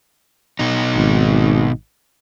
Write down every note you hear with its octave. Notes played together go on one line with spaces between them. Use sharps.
B2 D#4
G#1